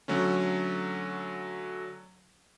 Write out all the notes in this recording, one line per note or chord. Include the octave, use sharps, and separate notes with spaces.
D3 F#3 A3 C#4